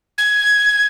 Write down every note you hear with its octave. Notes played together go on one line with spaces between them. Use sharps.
G#6